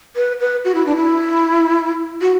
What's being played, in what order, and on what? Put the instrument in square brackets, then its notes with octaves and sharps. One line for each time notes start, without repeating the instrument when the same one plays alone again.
[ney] B4
B4
F#4
E4
D4
E4
F#4